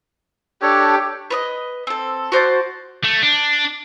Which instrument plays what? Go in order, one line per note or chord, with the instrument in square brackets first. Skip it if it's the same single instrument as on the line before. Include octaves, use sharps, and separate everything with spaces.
[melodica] D4 A4 C#5 [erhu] G4
[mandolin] B4 C#5 D#5
C4 A4
F#4 C5 D5 A5
[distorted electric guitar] A3
D4